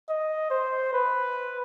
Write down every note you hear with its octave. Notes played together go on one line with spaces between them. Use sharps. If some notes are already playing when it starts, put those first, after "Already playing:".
D#5
C5
B4